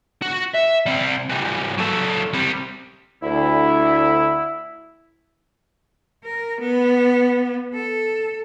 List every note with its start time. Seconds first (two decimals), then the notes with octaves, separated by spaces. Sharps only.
0.22 F#4
0.55 E5
0.86 G3 C4
1.29 E3 G3
1.78 F#3 A4
2.33 G3 C4
3.23 D2 E4
6.24 A#4
6.60 B3
7.74 A4